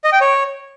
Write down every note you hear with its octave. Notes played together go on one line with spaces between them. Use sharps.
D#5
G5
C#5